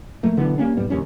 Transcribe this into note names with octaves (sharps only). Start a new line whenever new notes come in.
F2 A3 A#3
B1 D3 E3 B3
G3 A#3 C#4 D4
E1 G#2 G3 B3
D1 D#2 G3 C#4